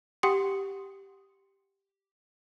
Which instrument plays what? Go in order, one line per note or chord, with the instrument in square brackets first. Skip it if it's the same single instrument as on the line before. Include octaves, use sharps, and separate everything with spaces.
[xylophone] G4 F#5 G5 C6 D#6 C#7